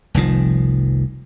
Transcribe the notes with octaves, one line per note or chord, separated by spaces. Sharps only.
F1 C2 D#3 F3